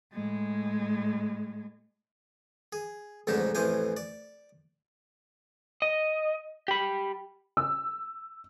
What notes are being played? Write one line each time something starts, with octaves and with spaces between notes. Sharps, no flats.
A2 G#3
G#4
A1 F2 G#2 D3 D#4 A5
A1 F2 E3 C5 G#5
D5
D#5
G4 B5
E6